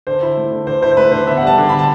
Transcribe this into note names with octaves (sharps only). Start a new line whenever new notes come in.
D3 C5
E4
A3
D3
D3 C5
E4 C5
C5
A3 B4
D3 C5
B3 E5
F#5
G3 A5
D3
B5
A5